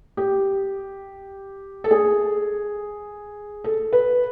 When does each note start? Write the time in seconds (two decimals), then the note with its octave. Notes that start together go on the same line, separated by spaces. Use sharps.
0.17 G4
1.84 A4
1.91 G#4
3.64 A4
3.93 B4